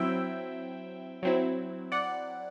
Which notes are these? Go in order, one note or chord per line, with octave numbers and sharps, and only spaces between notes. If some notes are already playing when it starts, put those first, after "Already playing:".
Already playing: F#3 C4 E4 E5 G5
F#3 C4 E4
D5 F#5